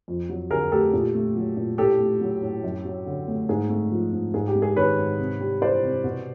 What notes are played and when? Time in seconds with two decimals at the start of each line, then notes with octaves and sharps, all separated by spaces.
0.08 F2
0.29 F#3
0.50 D3 G#4 A#4
0.72 A3 G4 A4
0.93 A#2
1.15 A3
1.36 F#3
1.57 A#2
1.78 A2 G4 A4
2.00 A3
2.21 F#3
2.42 A2
2.64 F#2
2.85 F#3
3.06 D3
3.28 A3
3.49 G#2 G#4
3.70 A3
3.92 F3
4.13 G#2
4.34 G#2 G#4
4.48 G4
4.55 G#3
4.62 G#4
4.77 D#3 B4 C#5
4.98 G#2
5.19 C3
5.40 G3
5.61 E3 C5 D5
5.83 C3
6.04 B2